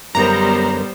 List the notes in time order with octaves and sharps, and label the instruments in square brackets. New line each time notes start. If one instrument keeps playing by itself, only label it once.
[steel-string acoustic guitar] F#2 D3 A#4 [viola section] G3 B3 C5 [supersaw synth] A#5